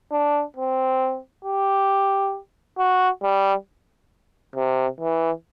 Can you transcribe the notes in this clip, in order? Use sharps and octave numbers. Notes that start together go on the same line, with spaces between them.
D4
C4
G4
F#4
G3
C3
E3